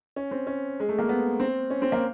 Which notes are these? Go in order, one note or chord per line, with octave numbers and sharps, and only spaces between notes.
C#4
C4
C#4
G#3
A3
A#3
B3
C4
C#4
C4
A#3